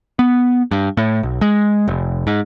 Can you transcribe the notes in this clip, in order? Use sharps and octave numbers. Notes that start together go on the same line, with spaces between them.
B3
G2
A2
B1
G#3
F1
G#2